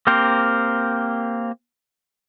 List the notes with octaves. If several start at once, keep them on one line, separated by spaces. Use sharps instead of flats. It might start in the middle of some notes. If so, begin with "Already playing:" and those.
A#3 C4 G4 A#4 C5